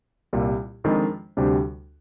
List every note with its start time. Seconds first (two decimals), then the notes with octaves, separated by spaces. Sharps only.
0.33 C2 A#2 G3
0.84 F2 D#3 G#3 D4
1.37 D2 C3 G3 D4 G4